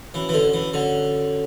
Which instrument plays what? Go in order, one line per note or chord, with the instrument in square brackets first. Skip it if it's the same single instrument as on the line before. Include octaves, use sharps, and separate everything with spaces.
[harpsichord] E3 [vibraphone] C#4 F#4 C#5
[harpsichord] E3
D3
E3
[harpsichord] D3 [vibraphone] C#4 F#4 C#5